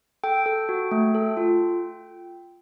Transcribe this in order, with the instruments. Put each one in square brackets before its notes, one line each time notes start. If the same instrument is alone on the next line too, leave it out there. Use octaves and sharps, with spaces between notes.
[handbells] A4 G5
A4
F#4
A3
A4
F4